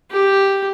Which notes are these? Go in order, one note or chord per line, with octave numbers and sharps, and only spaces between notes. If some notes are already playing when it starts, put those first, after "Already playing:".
G4